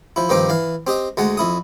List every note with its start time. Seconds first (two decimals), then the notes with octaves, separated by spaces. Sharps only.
0.16 F3 E4
0.29 G2 D#3 F3 C4 D6
0.49 E3 F5
0.87 C4 G4 D#5
1.17 D2 G#3 F#5 G#5
1.37 F2 E4 D#6